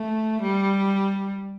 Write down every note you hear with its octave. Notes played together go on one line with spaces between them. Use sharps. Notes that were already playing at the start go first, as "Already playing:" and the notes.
Already playing: A3
G3